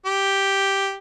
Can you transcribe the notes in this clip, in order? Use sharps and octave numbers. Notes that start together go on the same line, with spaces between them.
G4